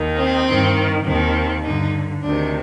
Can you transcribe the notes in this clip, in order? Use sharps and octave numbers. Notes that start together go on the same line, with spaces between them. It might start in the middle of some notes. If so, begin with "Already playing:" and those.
Already playing: D#2 D#3
C4
G2 D#3
D#2 D#3 C4
G2 D3 D#4
D2 C3 D#3 D4